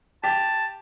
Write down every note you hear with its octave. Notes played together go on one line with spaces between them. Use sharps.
G4 A5